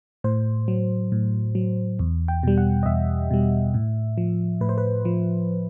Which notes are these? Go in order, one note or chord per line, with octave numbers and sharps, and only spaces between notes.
A2 C5
F#3
A2
F#3
E2
G5
B2 G3
F#5
D#5
E2 E5
B2 G3
A2
F3
A2 B4
C5
B4
F3